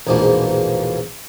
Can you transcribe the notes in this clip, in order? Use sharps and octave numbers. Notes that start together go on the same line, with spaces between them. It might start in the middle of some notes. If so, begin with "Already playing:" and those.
A#1 E2 G#2 B2 F3 A#3